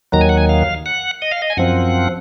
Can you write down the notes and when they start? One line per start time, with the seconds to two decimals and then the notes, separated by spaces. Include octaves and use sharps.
0.12 D#2 D#3 F#3 A#5
0.21 G#5
0.29 F#5
0.37 G#5
0.49 F5
0.86 F#5
1.22 D#5
1.31 F5
1.42 D#5
1.50 G#5
1.57 F#2 F3 C4 F#5